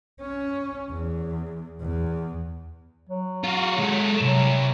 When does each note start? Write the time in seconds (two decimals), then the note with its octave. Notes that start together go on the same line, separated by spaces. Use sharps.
0.21 C#4
0.90 E2
1.81 E2
3.09 F#3
3.44 F4 F#4
3.80 G#3 A4
4.22 C2 F#3